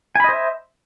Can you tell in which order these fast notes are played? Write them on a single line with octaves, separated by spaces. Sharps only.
G#5 B5 D#5 C5 E5